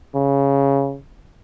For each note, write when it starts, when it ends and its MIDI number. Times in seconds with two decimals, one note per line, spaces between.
0.15 0.97 49